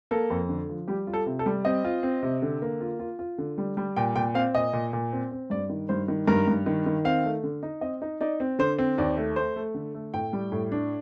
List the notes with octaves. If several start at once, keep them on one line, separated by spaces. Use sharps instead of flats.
A#3 A4
F2
D3
F3
G3 G4
F4
A4
C3
A4
G3
C4 D#5
F4
C4
C3
D3
A#3
F4
F4
F4
D3
G3
G3
A#2 G5
A#2 G5
C4 F5
A#2 D#5
A#2
A#2
C4
C4
G2 D5
D#3
G2 C5
D#3
G2 A#4
G2
D#3
D#3
C4 F5
A3
D3
D#4
C4 D#5
D#4
D#4 D5
C4
D3 C5
C4
D#2 D5
A3
A3 C5
A3
D3
A3
A2 G5
G3
A2
D4